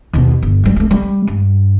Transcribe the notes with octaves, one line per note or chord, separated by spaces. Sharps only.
D#2 B2
G1
F#2 G3
G#3 A3
G3
G2